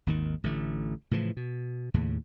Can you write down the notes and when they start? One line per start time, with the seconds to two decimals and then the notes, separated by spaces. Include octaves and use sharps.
0.07 G#1 D#2 D#3
0.44 A1 D3 A3
1.11 A2 C#3 E3 F3
1.37 B2
1.94 D#2 A2 C#3